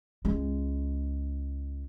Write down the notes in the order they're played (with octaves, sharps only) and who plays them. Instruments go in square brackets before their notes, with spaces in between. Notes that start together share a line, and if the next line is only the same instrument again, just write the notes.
[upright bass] C#2 G#3